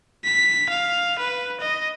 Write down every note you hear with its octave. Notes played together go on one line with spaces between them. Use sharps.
B6
F5
B4
D#5